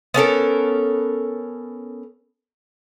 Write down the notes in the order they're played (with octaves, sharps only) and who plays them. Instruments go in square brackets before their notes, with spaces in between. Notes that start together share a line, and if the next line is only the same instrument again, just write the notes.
[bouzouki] B3 C#4 A4 A#4